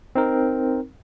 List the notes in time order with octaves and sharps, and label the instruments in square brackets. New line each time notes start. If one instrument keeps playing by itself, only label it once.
[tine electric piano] C4 D#4 A#4